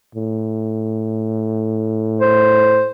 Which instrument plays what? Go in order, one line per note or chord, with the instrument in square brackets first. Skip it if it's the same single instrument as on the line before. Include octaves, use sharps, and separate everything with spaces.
[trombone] A2
[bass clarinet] C5